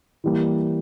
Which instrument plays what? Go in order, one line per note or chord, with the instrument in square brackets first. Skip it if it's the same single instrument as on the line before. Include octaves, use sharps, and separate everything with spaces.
[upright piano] E3 G3 A#3